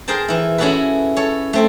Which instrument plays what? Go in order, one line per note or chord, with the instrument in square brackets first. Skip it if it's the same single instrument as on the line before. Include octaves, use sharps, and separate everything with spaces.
[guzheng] G#4 A#4 C5 G5 A5
E3 E4
C#4 E4 F#4 G#4 A4 B4
A4 C#5
A3 C4 A4